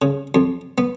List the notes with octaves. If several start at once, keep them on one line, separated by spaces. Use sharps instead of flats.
C#3
F2
B3